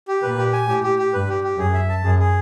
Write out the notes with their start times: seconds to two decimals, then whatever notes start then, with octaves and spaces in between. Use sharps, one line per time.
0.08 G4
0.22 A#2 B4
0.38 G4
0.53 G#5
0.68 A2 G4
0.83 G4
0.99 G4
1.13 G2 B4
1.29 G4
1.44 G4
1.59 F#2 G#4
1.74 E5
1.89 A5
2.04 F#2 G#4
2.19 G#4